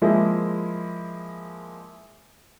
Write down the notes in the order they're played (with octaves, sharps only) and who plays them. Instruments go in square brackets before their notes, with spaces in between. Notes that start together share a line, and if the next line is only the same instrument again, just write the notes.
[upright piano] F3 G#3 A#3 E4